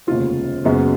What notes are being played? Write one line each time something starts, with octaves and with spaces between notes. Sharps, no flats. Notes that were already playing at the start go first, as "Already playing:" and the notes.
F1 D#2 C#3 G#3 B3 F4
F#1 F#2 C#3 G#3 B3